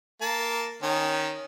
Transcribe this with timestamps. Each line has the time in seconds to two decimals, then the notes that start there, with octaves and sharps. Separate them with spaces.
0.21 A#3 A5
0.83 D#3 C#4